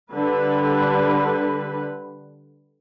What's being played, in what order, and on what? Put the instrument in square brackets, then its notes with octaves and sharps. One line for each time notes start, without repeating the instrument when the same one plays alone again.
[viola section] D3 G3 B4